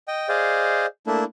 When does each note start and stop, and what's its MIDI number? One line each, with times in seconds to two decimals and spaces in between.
0.08 0.29 75
0.08 0.29 79
0.29 0.86 68
0.29 0.86 72
0.29 0.86 74
0.29 0.86 75
0.29 0.86 77
1.07 1.24 57
1.07 1.24 58
1.07 1.24 62
1.07 1.24 64